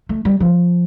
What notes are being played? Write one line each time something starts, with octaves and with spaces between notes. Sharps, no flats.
A3
G3
F3